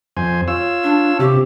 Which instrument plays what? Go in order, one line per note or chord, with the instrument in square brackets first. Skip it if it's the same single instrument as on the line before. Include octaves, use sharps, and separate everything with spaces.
[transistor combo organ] F2 C5 G#5
F4 C#5 E6
[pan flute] D4
[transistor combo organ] C3 [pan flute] G4